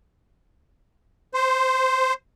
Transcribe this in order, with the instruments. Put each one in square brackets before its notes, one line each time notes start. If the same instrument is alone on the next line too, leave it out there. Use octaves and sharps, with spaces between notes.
[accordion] C5